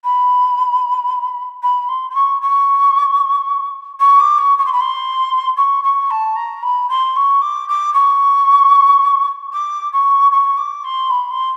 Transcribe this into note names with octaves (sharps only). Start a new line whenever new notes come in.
B5
B5
C6
C6
C#6
C#6
C#6
D6
C#6
C#6
C6
B5
C6
C#6
C#6
A5
A#5
B5
C6
C#6
D6
D6
C#6
D6
C#6
C#6
D6
C6
B5
C6